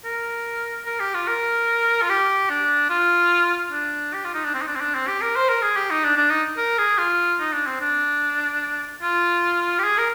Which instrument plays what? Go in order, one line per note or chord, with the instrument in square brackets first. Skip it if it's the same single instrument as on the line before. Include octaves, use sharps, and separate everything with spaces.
[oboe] A#4
A#4
G4
F4
A#4
F4
G4
D4
F4
D4
G4
F4
D#4
D4
C4
D#4
D4
C4
D4
C4
G4
A#4
C5
A#4
G#4
G4
D#4
D4
D4
D#4
A#4
G#4
F4
D#4
D4
C4
D4
F4
G4
G#4
A#4